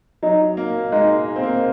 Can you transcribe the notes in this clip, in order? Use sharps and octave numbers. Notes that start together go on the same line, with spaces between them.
F#3 D#4
A#3
G#3 D#4
A#3
C4
A#3